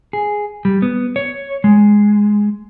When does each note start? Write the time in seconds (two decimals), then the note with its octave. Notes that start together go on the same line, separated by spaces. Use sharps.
0.13 G#4
0.65 G3
0.82 B3
1.16 C#5
1.64 G#3